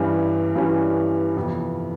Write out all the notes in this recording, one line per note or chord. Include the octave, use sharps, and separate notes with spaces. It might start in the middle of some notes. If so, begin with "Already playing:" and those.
Already playing: G2 E3 G3 C#4
G2 E3 G3 C#4
G1 F2 C3 E3